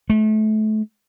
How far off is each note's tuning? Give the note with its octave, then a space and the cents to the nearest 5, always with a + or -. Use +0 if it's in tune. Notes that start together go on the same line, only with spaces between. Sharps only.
A3 -30